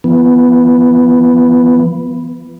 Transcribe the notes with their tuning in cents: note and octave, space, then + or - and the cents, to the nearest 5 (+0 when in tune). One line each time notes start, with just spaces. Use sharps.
F3 -45 B3 +0